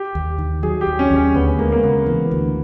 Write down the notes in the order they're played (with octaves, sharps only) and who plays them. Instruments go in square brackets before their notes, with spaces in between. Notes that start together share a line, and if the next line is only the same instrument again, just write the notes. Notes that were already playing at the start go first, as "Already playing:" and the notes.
Already playing: [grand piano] G4
[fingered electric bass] D#2
D#3
[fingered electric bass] F#3 [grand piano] G#4
[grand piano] G4
[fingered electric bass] D#2
[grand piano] C#4
[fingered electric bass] D#2
[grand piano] C#4
[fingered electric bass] D2 [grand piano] B3
[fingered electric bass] G#3 [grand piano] A#3
[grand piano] A#3
[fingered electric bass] C#3 [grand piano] B3
[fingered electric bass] E3
D2